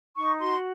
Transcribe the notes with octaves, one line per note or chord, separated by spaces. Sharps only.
D#4 C#6
F#4 C6